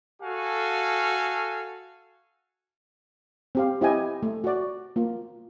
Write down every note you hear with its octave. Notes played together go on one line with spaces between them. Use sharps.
F#4 A4 F5 G#5
C4 G4 F5
C4 E4 G4 D#5 G5 G#5
A3
F#4 D5
A#3 F4